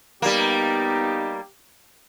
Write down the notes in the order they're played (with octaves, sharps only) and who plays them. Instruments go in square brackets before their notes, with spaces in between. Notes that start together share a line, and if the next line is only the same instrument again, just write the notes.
[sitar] G3 A#3 [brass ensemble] B3 D#4 [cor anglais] G4